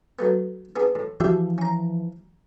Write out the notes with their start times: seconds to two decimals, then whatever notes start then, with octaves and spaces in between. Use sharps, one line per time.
0.19 F#3 A3 B3
0.76 B3 D4 G#4
0.95 A2
1.20 E3 F3 F#4 G4 E5
1.58 C#4 A#5